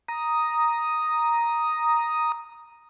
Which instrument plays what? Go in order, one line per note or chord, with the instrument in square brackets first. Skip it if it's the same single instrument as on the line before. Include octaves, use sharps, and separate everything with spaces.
[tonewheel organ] A#5 D#6